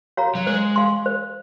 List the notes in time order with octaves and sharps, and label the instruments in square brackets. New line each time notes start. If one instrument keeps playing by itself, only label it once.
[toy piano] F#4 C#5 F5 A#5
[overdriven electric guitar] F#3
[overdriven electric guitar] G#3 [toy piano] C5
[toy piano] F5 C6
C5